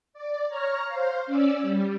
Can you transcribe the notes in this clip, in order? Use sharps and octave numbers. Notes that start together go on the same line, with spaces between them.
D5
C#5 A#5 C#6 F6
C5 F5
C#4 D5 E6
G3